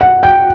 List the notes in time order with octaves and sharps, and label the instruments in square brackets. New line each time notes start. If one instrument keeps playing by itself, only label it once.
[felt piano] F#5
G5